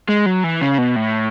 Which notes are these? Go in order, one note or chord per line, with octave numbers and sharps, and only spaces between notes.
G#3
F#3
E3
C#3
B2
A2